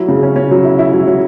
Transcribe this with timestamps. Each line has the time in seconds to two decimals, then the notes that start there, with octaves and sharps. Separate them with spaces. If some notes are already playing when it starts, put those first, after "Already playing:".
Already playing: F#3 E4
0.08 C#3
0.23 C#4
0.36 C#4
0.51 F#3
0.65 E4
0.79 E4
0.93 F#3
1.07 F#3